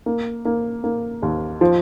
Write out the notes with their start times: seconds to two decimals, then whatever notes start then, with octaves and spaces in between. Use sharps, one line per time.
0.06 A#3
0.45 A#3
0.84 A#3
1.22 D#2
1.61 F3